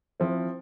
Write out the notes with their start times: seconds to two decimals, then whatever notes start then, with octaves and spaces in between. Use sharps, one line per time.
0.20 F3 C4 E4